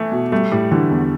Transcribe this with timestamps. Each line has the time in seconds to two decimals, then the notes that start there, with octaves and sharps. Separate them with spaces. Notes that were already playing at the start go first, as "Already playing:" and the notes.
Already playing: E3 A3
0.12 B2
0.32 G3 A3
0.52 A2 G3
0.71 D3 E3
0.91 E2